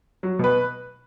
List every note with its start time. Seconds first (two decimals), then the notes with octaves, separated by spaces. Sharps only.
0.23 F#3
0.39 B2 B4